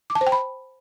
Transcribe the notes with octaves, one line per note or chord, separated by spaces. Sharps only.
D6
A5
C5
G5
B5